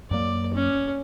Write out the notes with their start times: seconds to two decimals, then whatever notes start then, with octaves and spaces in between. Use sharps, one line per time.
0.11 F#2 F#3 A#3 D5
0.54 C#4